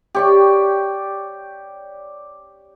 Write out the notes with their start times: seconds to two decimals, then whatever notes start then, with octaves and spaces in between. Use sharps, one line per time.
0.15 G4 C#5 D5